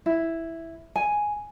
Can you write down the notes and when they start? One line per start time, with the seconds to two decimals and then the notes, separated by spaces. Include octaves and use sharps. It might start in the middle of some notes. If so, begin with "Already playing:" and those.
0.06 E4
0.96 G#5